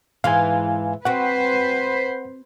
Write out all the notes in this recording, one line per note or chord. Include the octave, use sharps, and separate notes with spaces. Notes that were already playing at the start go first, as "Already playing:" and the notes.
G#2 E3 F5 G#5
C4 F#4 B4 C5 F#5